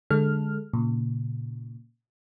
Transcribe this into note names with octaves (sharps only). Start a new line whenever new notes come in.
D3 G#3 A4 F6
A#2 C#3